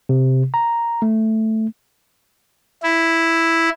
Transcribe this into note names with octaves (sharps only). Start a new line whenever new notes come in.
C3
A#5
A3
E4